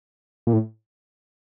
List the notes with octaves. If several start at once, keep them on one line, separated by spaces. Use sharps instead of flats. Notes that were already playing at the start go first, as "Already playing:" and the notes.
A#2
A2